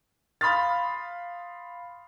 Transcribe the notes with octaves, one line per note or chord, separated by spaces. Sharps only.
F5 B5 C6 D#6 F6 A6